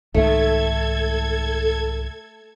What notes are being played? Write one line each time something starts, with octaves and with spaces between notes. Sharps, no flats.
C2 G#2 D#3 A3 A4 G#6